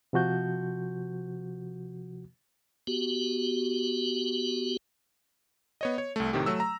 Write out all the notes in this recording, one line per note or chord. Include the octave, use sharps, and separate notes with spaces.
C3 F3 F#4 G6
B3 F#4 G4
B3 C#5 D#5
C#5
C2 A3
A2 C3 D#3 G4
F#3 A3 E6
A#5